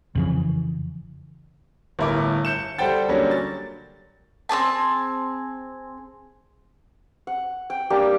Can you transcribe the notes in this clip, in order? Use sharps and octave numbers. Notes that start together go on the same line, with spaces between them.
F2 C#3 E3
G1 A2 E4 A#4 D6
G6 C#7 E7
G3 A4 C5 F#5 G5 A6
D3 F#3 G3 A#3 C#4
A6
C4 D4 G#4 A5
F#5
G5
A#3 D4 G4